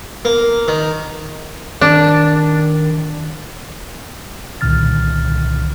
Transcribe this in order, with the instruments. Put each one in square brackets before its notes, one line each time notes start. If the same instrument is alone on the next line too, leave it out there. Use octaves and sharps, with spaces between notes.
[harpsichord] A#3
D#3
[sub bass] D#3 [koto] D4
[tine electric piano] C2 A#2 D3 D#3 F6 A6